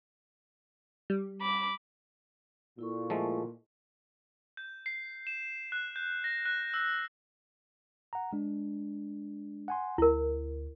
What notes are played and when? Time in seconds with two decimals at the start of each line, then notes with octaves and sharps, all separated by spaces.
1.10 G3
1.42 B5 D6
2.79 A#2 E4 A4 C#6
3.10 F3 G#3 A3
4.57 G6
4.86 C7
5.27 E7
5.72 F#6
5.96 G6
6.24 A#6
6.46 F#6
6.74 E6
8.13 F#5 A#5
8.33 G#3 D4
9.68 F#5 G#5 C6
9.98 D2 E4 A#4